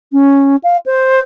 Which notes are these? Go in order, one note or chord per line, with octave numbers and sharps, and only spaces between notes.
C#4
F5
C5